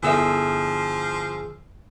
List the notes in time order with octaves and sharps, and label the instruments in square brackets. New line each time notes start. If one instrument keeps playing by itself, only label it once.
[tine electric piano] G1 G#4 E6 [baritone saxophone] F3 [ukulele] E4 A4 E5